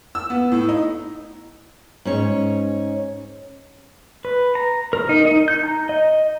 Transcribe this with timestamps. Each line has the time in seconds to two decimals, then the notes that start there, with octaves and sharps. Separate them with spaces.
0.15 E6
0.30 B3
0.52 A2
0.69 D#4
2.05 G#2 C#4 C#5
4.25 B4
4.55 A#5
4.93 A#4
5.09 D#4
5.25 D#4
5.48 G6
5.64 A#5
5.89 D#5